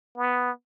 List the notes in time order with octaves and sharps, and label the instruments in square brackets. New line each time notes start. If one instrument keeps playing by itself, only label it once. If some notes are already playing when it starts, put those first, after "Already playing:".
[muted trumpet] B3